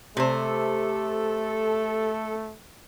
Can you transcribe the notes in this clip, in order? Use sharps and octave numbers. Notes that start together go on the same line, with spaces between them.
C3 A3 A4 C5